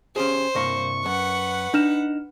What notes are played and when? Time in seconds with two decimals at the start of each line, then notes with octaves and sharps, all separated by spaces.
0.16 C#4 G4 G#4 C5
0.55 C2 G2 A#3 C#6
1.06 F#2 B4 F#5
1.74 D4 D#4 F6 E7